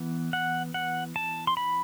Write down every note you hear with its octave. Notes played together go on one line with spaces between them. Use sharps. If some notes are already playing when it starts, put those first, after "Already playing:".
Already playing: E3 B3
F#5
F#5
A5
C6
B5